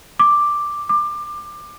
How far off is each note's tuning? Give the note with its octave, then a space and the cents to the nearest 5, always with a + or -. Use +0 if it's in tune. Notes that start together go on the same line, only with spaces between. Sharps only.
D6 +5
D6 +20